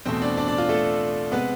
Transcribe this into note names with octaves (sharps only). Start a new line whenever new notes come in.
E2 B2 A3 C4 C5
D4 D5
D4 D5
D4 D5
F4
A3 A4
C3 G#3 B3 B4